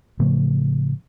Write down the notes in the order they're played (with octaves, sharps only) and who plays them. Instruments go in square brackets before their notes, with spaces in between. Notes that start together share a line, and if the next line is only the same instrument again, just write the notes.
[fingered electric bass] A2 C#3 F3 A3